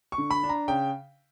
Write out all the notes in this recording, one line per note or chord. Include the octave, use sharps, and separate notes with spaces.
C#6
D3
B5
D4
A#5
C#3 G5